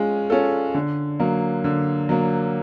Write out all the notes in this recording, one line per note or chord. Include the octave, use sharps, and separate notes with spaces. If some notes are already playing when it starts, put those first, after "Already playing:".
Already playing: G#3 C#4 F4
C#4 F4 A4
D3
F#3 A#3
D3
F#3 A#3